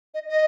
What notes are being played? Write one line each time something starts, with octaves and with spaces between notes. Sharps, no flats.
D#5
D#5